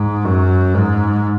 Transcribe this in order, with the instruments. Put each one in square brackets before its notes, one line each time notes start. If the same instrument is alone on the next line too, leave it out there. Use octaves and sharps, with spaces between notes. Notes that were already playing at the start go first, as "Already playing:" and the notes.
Already playing: [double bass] G#2
F#2
G#2